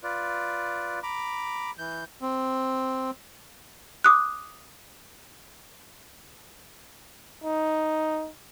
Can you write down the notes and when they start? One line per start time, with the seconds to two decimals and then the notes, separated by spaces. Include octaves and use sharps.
0.03 F4 B4 D5
1.03 A#5 B5 D6
1.79 E3 G6
2.21 C4
4.04 D6 D#6 F#6
7.44 D#4